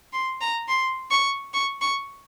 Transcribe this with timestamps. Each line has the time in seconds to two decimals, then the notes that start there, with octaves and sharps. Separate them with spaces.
0.13 C6
0.41 A#5
0.68 C6
1.11 C#6
1.54 C#6
1.81 C#6